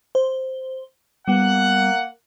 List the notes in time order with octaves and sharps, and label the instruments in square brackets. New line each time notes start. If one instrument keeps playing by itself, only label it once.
[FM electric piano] C5
[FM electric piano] G3 B3 [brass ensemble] A#3 F#5